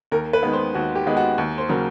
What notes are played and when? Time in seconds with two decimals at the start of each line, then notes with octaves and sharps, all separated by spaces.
0.11 D#2 A#4
0.33 B4
0.43 D#3 G#3 B3
0.53 C5
0.74 D#2 F#4
0.95 G4
1.06 D#3 G#3 B3
1.17 F#4
1.38 D#2
1.58 C5
1.69 C#3 F#3 A#3